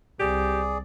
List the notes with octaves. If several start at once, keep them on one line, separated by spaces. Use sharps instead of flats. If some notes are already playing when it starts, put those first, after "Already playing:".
C2 G4 G#4 D5